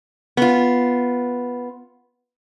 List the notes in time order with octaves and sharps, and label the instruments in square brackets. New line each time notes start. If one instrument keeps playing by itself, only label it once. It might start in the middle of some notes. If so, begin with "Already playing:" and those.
[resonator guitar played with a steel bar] B3 F4